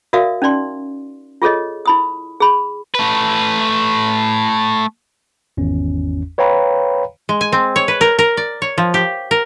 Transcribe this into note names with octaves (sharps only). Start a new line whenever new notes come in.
F#4 A#4 D5 E5 F5 D#6
C#4 D#4 D5 C6
F4 G#4 A4 C#5 D#5
E4 B5 D#6
G#4 B5
A3 B4
G#1 E2 C#4
B4 C#5 F5 G5 A#5 B5
G#3
G#5
C4
C#5
B4
A#4
A#4
D5
C#5
F3
G4
A#4